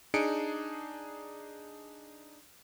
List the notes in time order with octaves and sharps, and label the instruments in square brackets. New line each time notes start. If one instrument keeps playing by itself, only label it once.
[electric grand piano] D4 D#4 G#4 C#7 D7